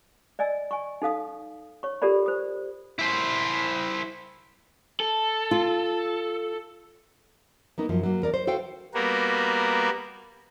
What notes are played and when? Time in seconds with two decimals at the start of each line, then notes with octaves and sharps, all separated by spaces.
0.39 D5 D#5 G#5 E6
0.71 G#5 C#6
1.02 D#4 A4 F5 D#6
1.83 C#5 C#6
2.02 F4 G4 A4 A#4 D5 B5
2.26 C5 D#6
2.99 E4 C5
5.00 A4
5.51 F4
7.78 A#3 B3 D#4
7.89 F#2 F3
8.03 F#3 A#3
8.22 E2 A#4 D5
8.34 C5
8.47 F#4 A4 C5 F5 G5
8.94 G3 A#3 B3 F#4 A#4